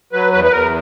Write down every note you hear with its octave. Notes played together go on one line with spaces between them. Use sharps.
F#3 B4
E2 B4
B4
E2 A#4